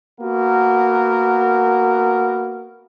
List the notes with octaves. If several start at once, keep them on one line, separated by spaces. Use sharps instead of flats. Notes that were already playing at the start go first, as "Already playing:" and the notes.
A#3 B3 F#4 A#4